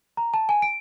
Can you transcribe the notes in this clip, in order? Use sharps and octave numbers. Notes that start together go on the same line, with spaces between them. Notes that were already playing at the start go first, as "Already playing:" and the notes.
A#5
A5
G#5
D7